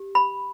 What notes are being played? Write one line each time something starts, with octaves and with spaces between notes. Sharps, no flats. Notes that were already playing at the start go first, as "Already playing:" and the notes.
Already playing: G4
B5